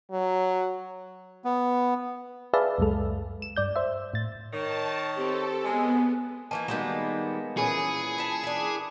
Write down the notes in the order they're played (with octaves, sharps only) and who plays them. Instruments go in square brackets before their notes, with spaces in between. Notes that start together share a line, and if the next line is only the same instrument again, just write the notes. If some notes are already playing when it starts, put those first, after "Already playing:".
[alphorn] F#3
[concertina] B3
[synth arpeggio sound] G#4 B4 D5 E5 F5 A5
C#2 F#2 G#3 A4
E7
G2 D5 G6
C5 E5
A2 A6
[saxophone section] D#3 [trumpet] C#5 [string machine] A5
[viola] C4 G4 [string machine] A4
[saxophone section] G#3 [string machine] B3 [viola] G#4 [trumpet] G#5
[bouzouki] D#3 E3 A#3 [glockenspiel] G#5 A5
[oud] D#3 G3 F#4 [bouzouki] G#3 A#3 B3 [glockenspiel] G6 E7
[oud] A#2 E3 C#4 [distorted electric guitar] G#4 [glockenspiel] G#5 B5 C#7
[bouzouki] B4 A5
D4 E4